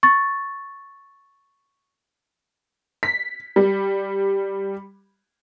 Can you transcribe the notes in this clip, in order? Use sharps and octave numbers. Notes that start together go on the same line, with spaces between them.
C#6 A6
B6
G3